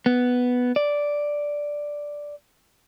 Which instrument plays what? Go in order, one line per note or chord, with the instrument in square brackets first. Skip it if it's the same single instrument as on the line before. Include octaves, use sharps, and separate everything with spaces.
[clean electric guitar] B3
D5